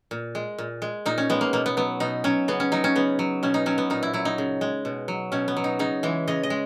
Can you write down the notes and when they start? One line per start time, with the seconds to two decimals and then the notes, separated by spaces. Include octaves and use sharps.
0.11 A#2
0.35 G#3
0.58 A#2
0.82 G#3
1.06 A#2 D#4
1.18 C#4
1.30 G#3 B3
1.41 A#3
1.53 B2 A#3
1.66 B3
1.77 F#3 B3
2.00 B2 D#4
2.24 F#3 C#4
2.48 C#3 B3
2.60 C#4
2.72 F#3 D#4
2.84 C#4
2.96 C#3 B3
3.19 F#3
3.43 B2 C#4
3.54 D#4
3.66 F#3 C#4
3.78 B3
3.90 A#2 D#4
4.03 E4
4.13 F#3 E4
4.25 D#4
4.38 C#3
4.61 G#3
4.85 B2
5.08 F#3
5.32 B2 C#4
5.48 B3
5.57 F#3
5.64 D#4
5.79 C#3 D#4
6.03 E3 G#3
6.28 C#3 D#5
6.43 D#5
6.50 G#3